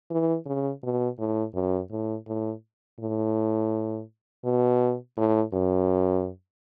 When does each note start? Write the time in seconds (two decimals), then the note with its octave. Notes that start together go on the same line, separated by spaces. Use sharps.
0.11 E3
0.46 C#3
0.83 B2
1.19 A2
1.54 F#2
1.91 A2
2.27 A2
3.00 A2
4.44 B2
5.17 A2
5.53 F#2